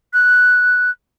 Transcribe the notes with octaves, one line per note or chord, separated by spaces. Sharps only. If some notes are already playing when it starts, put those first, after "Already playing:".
F#6